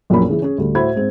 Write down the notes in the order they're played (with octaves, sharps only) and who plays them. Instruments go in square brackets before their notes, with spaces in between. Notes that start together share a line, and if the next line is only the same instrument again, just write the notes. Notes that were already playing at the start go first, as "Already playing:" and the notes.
[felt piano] A#1 F#2 A#2 A#4 B5
C#3 E3 G#4
C#4 G#4
D2 G3
A2 F#4 C5 E5 B5 G#6
G#2 C4